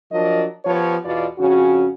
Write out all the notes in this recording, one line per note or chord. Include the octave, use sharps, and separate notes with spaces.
F3 F#3 D4 A#4 D#5
F3 B3 G4 C#5
E2 B2 F4 D5
F2 C#3 C#4 F#4